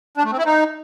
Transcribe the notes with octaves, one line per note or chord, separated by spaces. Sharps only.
D4
A3
C4
E4
D#4